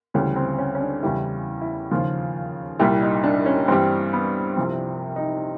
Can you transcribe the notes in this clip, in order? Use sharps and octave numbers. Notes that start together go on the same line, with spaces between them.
D2 C#3 E3 G3 C#4
C4
C#4
C#4
D4
E2 C#3 E3 G3 E4
E4
D#2 C#3 F3 F4
C2 A#2 G3 E4
D#4
D4
C#4
G2 E3 G3 C4
B3
C2 C3 F3 C4
D#4